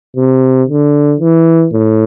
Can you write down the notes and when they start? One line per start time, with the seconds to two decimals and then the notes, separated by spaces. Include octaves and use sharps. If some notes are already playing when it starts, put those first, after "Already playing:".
0.17 C3
0.69 D3
1.21 E3
1.73 A2